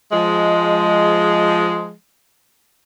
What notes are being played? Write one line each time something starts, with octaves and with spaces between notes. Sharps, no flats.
F3 G#3